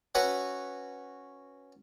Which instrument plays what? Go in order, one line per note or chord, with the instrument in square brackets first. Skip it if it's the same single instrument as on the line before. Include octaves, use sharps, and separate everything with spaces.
[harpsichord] C#4 F#4 B4 C#5 E5 F#5